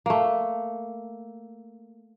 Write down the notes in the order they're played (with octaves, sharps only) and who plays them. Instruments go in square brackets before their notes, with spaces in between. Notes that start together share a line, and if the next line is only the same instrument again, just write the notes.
[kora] A3 A#3